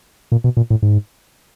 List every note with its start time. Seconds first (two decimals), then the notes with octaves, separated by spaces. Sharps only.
0.32 A#2
0.44 B2
0.57 A#2
0.70 A2
0.83 G#2